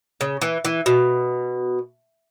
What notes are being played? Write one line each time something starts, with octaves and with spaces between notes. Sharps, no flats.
C#3
E3
E3
B2